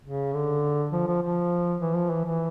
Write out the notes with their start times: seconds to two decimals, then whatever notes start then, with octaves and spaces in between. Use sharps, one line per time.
0.05 C#3
0.34 D3
0.93 F3
1.07 F3
1.23 F3
1.80 E3
1.95 F3
2.10 E3
2.25 E3